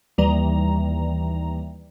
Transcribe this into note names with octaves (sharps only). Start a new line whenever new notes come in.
D#2 E3 G3 A#5